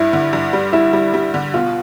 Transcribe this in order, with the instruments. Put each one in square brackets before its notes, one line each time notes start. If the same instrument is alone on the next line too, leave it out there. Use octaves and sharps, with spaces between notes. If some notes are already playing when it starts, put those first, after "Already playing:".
Already playing: [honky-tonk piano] G2 [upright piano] E4
[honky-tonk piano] D3
G2
G3
[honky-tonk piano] G3 [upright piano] E4
[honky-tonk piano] G3
G3
D3
[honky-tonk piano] B2 [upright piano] F4